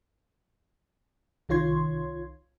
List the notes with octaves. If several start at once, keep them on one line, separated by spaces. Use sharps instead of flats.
C2 D#3 F4 C#5 C6 G#6